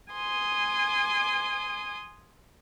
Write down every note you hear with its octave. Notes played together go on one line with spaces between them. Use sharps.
G#5 C6 D#6